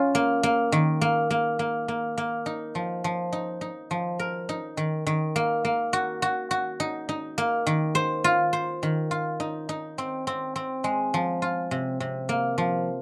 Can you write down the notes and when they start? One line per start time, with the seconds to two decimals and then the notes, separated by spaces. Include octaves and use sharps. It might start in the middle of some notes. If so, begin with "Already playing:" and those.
Already playing: C#4 F4
0.15 A#3
0.43 A#3
0.72 D#3
1.01 A#3
1.31 A#3
1.59 A#3
1.88 A#3
2.18 A#3
2.46 D#4
2.75 F3
3.04 F3
3.33 D#4
3.61 D#4
3.91 F3
4.19 A#4
4.49 D#4
4.77 D#3
5.07 D#3
5.36 A#3
5.65 A#3
5.93 F#4
6.22 F#4
6.51 F#4
6.80 D#4
7.09 D#4
7.38 A#3
7.67 D#3
7.95 C5
8.24 F4
8.53 C5
8.83 D#3
9.11 F4
9.40 D#4
9.69 D#4
9.98 C4
10.27 C4
10.56 C4
10.84 G#3
11.14 F3
11.42 F4
11.71 C3
12.00 C3
12.29 A#3
12.58 F3